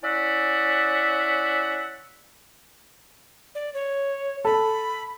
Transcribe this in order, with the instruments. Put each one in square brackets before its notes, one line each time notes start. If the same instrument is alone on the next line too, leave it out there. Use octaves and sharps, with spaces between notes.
[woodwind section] C#4 E4 D5 E5 F#5
[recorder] D5
C#5
[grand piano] A4 [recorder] B5